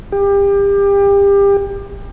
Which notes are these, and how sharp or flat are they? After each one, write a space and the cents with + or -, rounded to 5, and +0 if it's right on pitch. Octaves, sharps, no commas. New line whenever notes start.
G4 +30